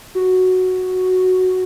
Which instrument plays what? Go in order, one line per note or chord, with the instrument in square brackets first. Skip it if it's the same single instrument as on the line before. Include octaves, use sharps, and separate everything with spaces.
[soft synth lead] F#4